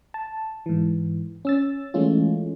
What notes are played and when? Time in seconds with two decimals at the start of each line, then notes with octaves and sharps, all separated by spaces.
0.14 A5
0.66 G#2 E3
1.45 C#4 E6 A6
1.94 E3 G#3 A3 C#4 F4